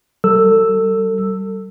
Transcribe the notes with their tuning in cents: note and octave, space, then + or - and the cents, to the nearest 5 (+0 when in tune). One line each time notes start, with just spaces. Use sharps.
G3 -30 A4 +35 E6 +0